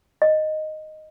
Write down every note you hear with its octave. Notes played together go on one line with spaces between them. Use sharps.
D#5